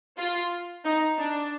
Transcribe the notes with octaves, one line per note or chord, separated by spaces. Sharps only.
F4
D#4
D4